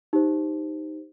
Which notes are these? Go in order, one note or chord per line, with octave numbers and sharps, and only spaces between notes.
D#4 G4 C5